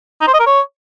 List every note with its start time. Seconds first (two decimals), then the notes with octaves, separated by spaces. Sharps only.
0.21 D#4
0.27 C5
0.34 D#5
0.40 A#4
0.46 C#5